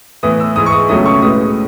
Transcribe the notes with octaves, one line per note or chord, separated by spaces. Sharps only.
A2 E3 B3 D#6
E6
G#2 E3 G#3 D#6
C#6
D#6
C#2 B2 F#3 A3 C#4 D#6
C#6
A2 G#3 B3 D#6